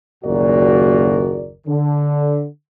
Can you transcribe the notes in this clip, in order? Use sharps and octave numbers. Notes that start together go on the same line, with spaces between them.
F#1 D#2 A#2 F#4 A#4 D5
D3